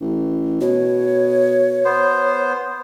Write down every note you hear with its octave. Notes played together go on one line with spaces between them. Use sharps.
A1
B2 C#5
B3 C5